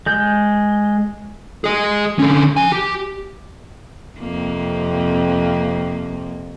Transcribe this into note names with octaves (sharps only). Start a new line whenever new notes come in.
G#3 G6
G#4 D#5
D3 C#4
F3 G#5
G4
F2 C3 A#3